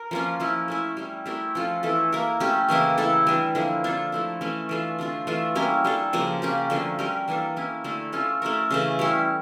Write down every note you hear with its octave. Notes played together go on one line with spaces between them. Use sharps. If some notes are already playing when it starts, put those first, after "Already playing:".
Already playing: A#4
F3 A#3 C#4 F4
F3 C#4 E4
A3 C#4 E4
G3 C#4 E4
A3 E4 G4 A#4
F3 C#4 F4 A4
E3 A3 E4 A4
A#3 E4 A#4
A3 C#4 G4
C#3 E3 A#3 E4
A3 E4 A4
E3 G3 D4
D3 F3 A#3 E4
A#3 D4 F4 A4
F3 A3 E4
E3 A3 C#4
E3 A3 D4 F4
D3 A3 D4 F4
E3 A3 D4 F4
G3 A#3 C#4 E4
G3 D4 A4
C#3 F3 A#3
A#3 C#4 G4
D3 F3 A3 C#4
G3 C#4 G4 A#4
E3 A#3 D4 A4
A#3 C#4 E4
D3 A3 E4
A3 C#4 F4 A4
A3 C#4 E4 A#4
C#3 E3 A3
G3 C#4 E4